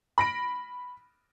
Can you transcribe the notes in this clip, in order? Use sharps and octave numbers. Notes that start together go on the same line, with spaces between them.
B5 A#6 D7